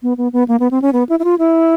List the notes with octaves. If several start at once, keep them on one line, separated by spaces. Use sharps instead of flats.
B3
B3
B3
A#3
B3
C4
C#4
B3
E4
E4
F4
E4